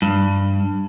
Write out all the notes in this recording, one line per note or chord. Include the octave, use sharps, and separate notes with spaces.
G2